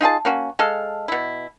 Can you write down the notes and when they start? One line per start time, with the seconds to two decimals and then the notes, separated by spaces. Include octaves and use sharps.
0.01 D#4 F4 G#4 A5
0.25 A#3 C#4 F#4
0.59 G#3 A4 F5
1.08 B2 E4